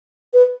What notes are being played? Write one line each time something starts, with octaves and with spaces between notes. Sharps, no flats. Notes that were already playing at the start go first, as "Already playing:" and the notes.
B4